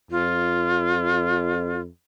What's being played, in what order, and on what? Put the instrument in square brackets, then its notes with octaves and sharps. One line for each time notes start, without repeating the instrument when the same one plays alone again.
[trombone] F2 [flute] F4